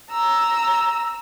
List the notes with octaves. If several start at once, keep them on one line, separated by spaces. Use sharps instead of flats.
A#5 E6